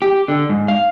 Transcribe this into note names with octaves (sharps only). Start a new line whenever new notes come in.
G4
D3
G#2
F5